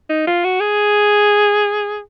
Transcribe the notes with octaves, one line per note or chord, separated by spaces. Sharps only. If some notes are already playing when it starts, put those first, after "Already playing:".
D#4
F4
F#4
G#4